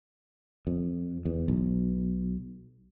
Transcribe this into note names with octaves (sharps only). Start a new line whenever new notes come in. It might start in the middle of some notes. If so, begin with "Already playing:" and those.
F2
E2
B1